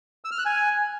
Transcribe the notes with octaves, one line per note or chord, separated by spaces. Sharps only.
E6
F6
F#6
G#5